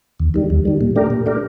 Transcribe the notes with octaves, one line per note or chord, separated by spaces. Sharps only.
D#2
D#3 G3
D#2
D#3 G3
A#2
A3 D4 G4 A#4
A#2
A3 D4 G4 A#4